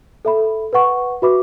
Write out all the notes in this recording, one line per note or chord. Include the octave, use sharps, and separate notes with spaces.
A4 E5 B5
B4 F#5 C#6
F#4 B4 E5 B5 D6